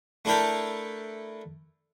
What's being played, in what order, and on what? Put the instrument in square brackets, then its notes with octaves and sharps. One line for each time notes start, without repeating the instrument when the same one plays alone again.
[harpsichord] A3 D4 E4 A4 A#4 G5